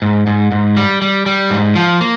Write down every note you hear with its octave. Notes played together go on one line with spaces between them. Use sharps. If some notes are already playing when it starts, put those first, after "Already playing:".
G#2
G#2
G#2
G3
G3
G3
G#2
F3
A#3